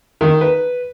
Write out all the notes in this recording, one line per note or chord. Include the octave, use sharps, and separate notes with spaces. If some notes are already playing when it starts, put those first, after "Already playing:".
D#3
B4